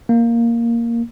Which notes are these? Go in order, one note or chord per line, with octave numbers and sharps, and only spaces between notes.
A#3